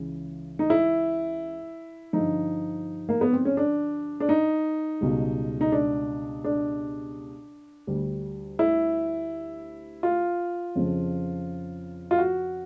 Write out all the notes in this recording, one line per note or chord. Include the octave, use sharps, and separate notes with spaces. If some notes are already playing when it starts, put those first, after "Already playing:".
Already playing: C#2 C#3 E3
D#4
E4
G2 D3 F3 D#4
A#3
B3
C4
C#4
D4
D4
D#4
C#2 B2 G3
D#4
D4
D4
D2 D3 G3
E4
F4
F2 C#3 F3
F4
F#4